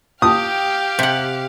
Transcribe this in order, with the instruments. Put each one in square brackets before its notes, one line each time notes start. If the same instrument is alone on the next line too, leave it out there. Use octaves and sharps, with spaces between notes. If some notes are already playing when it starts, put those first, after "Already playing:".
[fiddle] G4 F5 [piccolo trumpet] G5 [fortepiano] D#6
[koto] C3 F#5